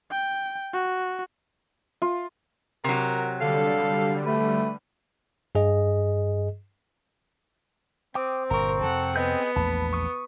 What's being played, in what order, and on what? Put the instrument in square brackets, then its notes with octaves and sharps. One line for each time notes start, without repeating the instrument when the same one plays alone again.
[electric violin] G5
F#4
[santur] F4
[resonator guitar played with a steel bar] C3 F#3 [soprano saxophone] A#4
[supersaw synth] D3 G3 [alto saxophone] A4 [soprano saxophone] F5
[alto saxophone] A3 [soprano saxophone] B4
[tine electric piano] G2 G#4 D#5
[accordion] C4 [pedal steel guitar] G5 D6 D#6
[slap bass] G1 A#2 [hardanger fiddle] A#4 [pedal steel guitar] A#5 C#6
[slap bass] F2 C3 [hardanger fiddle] A4 F#5
[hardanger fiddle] B3 [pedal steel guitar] G#4 D#5 G6
[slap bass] A#1 E2 A3 [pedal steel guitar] A5 B5
[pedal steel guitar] C#6 D#6